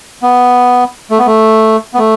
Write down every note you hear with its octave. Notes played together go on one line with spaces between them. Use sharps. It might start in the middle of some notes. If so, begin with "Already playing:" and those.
B3
A3
B3
A3
B3
A3